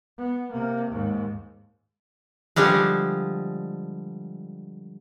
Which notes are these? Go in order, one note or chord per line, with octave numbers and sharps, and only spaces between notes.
B3
C3 A#3
D#2 G#2
D3 F3 G3 G#3